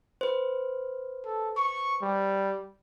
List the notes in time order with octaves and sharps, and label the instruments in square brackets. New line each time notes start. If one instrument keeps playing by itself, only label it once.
[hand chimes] B4 C5
[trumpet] A4
C#6
G3